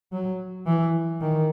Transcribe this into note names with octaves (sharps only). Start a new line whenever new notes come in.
F#3
E3
D#3